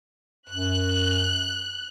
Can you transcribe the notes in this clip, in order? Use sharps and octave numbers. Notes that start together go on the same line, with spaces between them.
F#2 F#6